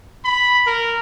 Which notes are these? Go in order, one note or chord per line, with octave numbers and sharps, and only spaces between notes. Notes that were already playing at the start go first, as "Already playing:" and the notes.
B5
A#4